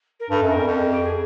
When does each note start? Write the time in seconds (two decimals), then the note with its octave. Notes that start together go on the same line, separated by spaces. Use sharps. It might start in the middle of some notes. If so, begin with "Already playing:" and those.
0.19 A#4
0.30 G2 A4
0.42 F#2
0.48 A#4
0.55 F2
0.66 F2 A4
0.78 G#4
0.90 G4
1.02 G#4